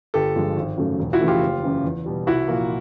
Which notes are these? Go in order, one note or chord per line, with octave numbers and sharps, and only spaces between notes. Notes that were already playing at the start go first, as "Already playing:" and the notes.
G1 G4 A4
G2 D3 F3 G#3
G#1
F#2 C#3 F#3 A3
E1
E4 F#4
E2 C#3 F3 A3
F4 G4
F#1
F#2 C#3 E3
E2
B2 G3
C2 E4 F#4
A#2 F3 A#3